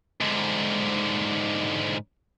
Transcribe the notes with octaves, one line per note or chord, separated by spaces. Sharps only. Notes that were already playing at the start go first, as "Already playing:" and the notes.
G#2 D3